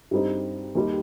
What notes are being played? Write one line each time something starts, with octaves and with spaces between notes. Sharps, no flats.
G2 G3 C4 D#4
D#2 D#3 G3